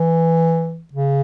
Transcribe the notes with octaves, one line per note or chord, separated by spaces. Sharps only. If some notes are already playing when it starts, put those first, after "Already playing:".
Already playing: E3
C#3